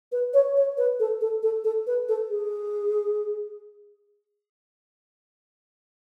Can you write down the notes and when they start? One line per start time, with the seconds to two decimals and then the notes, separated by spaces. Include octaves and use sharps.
0.12 B4
0.34 C#5
0.57 C#5
0.78 B4
1.00 A4
1.21 A4
1.43 A4
1.64 A4
1.87 B4
2.09 A4
2.30 G#4